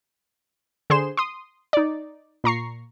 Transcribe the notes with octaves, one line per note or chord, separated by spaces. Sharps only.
D3 G#4 C5 C6 E7
C6 D#6
D#4 D5
A#2 A#5 C#6 C7